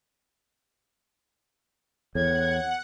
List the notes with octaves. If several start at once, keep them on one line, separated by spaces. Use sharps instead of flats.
E2 A2 F#5 G#6